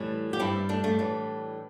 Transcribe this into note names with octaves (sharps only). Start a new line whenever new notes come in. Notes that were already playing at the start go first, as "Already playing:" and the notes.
Already playing: A2 E3 G3
G4
G2 G3 C4 E4
A3 D4
A3 D4
A2 E3 G3